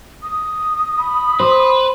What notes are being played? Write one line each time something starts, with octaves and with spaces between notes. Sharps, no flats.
D#6
B5
B4 C5